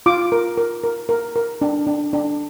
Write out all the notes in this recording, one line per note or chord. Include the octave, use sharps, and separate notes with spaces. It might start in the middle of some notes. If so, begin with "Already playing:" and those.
F4 D6
A#4
A#4
A#4
A#4
A#4
D4
D4
D4